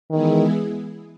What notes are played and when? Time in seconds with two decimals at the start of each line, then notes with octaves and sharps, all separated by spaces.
0.10 D#3 E3 G#3 B3 E4 G#4